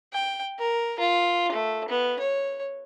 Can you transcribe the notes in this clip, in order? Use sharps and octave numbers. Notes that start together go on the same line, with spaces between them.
G5
A#4
F4
A3
B3
C#5